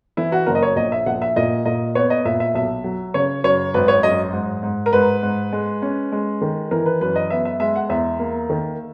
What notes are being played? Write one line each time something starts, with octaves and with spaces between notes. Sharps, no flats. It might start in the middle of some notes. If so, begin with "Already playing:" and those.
E3 E4
F#4
F#1 A#4
D#5
C#5
A#1 D#5
E5
A#1 F#5
E5
A#2 D#5
A#2 D#5
B3 C#5
D#5
A#2 E5
E5
B1 E5
F#3
C#3 C#5
F#2 C#5
G#1 B4
C#5
F#2 D#5
G#2
G#2
A#4
G#2 B4
G#2
G#3
C#4
G#3
D#3
E3 A#4
B4
F#2 B4
D#5
B3 E5
E5
G#3 E5
F#5
E2 E5
A#3
D#3